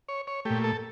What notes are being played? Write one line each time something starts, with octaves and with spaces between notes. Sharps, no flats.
C#5
C#5
A#2 A3 G4
A4